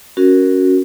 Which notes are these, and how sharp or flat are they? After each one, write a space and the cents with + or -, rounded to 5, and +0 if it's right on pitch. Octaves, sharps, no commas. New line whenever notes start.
C#4 +0 F#4 +0 A#4 +0